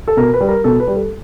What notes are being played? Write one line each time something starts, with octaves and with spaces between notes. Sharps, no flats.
A4
B2 A#4
B4
G3
A#4
B2 A4
B4
G3
A4